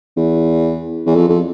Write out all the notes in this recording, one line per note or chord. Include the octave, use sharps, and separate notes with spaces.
E2
E2
F2
F2